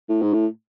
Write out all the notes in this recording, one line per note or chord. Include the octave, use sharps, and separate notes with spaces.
A2
G#2
A2